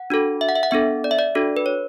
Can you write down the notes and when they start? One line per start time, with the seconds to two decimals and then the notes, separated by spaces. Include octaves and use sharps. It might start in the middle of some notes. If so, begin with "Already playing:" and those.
Already playing: F#5
0.10 D4 F#4 A4
0.41 E5
0.49 F#5
0.56 E5
0.63 F#5
0.71 B3 D4 A4 E5
1.04 D5
1.11 E5
1.19 D5
1.35 D4 F#4 A4
1.57 B4
1.66 C#5